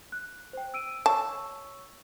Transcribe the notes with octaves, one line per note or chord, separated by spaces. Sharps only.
F#6
C5 G5
E6 D7 D#7
C#5 A5 C#6 E6